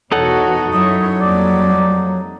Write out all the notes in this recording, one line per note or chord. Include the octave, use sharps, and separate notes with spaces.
E2 B2 D#4 F#4 A4 C#5 F#5
F#2 F#3 E4 C#5 D#5
F2 G3 A#3 D5